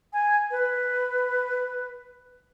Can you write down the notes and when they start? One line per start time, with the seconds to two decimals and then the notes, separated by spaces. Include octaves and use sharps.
0.13 G#5
0.51 B4